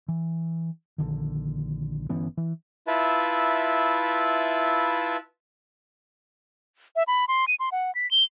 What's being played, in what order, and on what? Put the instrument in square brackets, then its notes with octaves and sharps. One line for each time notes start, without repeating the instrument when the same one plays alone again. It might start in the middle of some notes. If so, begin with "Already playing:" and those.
[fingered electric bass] E3
A#1 D3 D#3
G1 E3 B3 C#4
E3
[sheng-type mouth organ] E4 F4 B4 E5 A5
[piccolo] E5
B5
C6
D#7
C6
F#5
B6
G7